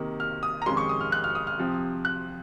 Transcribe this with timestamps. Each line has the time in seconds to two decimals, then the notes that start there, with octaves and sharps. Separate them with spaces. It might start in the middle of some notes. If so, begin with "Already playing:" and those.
Already playing: C3 D#3 A#3
0.20 F6
0.43 D#6
0.62 A#5
0.66 F2 C3 D#3 G#3 C#4 C6
0.77 C#6
0.89 D#6
1.01 F6
1.12 F#6
1.24 F6
1.35 D#6
1.47 F6
1.59 C3 F3 C4
2.05 F#6